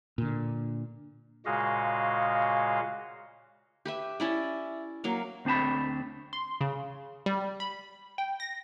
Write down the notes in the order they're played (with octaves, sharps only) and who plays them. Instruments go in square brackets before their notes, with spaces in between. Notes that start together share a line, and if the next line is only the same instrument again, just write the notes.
[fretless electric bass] A#2 D3
[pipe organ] A#2 C#3 G#3 F#4 D#5 F5
[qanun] G4 B4 E5
C#4 E4 D5
F#3 A#3 F5
[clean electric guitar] D2 C4 D4 A5 B5
[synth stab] C6
C#3
G3
B5
G5
A#6